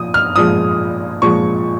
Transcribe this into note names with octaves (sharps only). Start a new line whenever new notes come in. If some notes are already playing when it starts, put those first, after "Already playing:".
Already playing: A#2 F3 D#6
F6
A#2 F3 G#3 D#6
A#2 F3 G#3 C#6